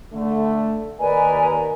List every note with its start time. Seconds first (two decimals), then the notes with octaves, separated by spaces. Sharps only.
0.13 D3 A3
1.01 D#2 A#4 B4 D5 D#5 G#5